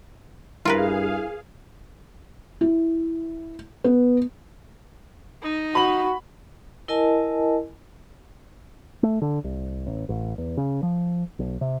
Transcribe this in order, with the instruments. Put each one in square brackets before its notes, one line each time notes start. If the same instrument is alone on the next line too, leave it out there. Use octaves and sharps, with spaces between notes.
[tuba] G2 [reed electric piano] E4 [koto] F4 A#4 B4 [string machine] G#4 F5
[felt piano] E4
B3
[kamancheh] D#4
[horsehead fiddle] F#4 [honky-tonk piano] B5 F#7
[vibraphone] E4 A#4 D#5 G#5 A5
[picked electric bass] A3
D3
C2
A1
A1
E2
C#3
F3
B1
C3